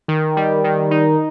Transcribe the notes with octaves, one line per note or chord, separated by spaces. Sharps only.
D#3
G3
D#3
D#4